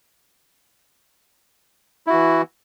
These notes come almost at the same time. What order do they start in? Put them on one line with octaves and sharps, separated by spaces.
E4 F#4 E3